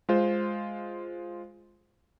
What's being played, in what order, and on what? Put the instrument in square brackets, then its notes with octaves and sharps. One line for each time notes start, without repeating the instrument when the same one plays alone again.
[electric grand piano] G#3 F4 C5